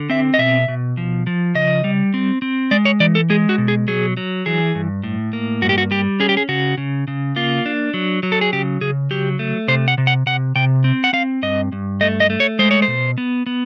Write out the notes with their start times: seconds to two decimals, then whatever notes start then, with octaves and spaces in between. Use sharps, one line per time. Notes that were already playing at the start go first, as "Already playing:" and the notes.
Already playing: D3
0.10 C4 E5
0.34 D#5
0.38 B2 E5
0.68 B2
0.97 F3
1.27 F3
1.55 C#3 D#5
1.84 G3
2.14 C4
2.42 C4
2.71 G#3 D5
2.85 C#5
3.00 E3 D5
3.15 A4
3.30 G#3 G#4
3.49 F#4
3.58 B2
3.68 G#4
3.88 F#3 G#4
4.17 F#3
4.46 E3 G#4
4.75 G2
5.03 A2
5.33 A#3
5.62 G2 F#4
5.69 G4
5.78 F#4
5.91 G3 G4
6.20 C#4 G#4
6.29 G4
6.37 G#4
6.49 C#3 F#4
6.78 C#3
7.08 C#3
7.36 A#3 F4
7.66 D4
7.94 F#3
8.23 F#3
8.32 A4
8.41 G#4
8.53 C#3 G4
8.81 C#3 G#4
9.11 F#3 G4
9.39 A3
9.68 C3 C5
9.88 F#5
9.98 C3
10.07 F#5
10.26 C3 F#5
10.56 C3 G5
10.84 C4
11.04 F#5
11.13 C4 F5
11.43 G2 D#5
11.72 G2
12.01 A3 D#5
12.20 D#5
12.30 A3
12.40 C#5
12.59 G#3 C5
12.71 C#5
12.82 C5
12.88 B2
13.18 B3
13.46 B3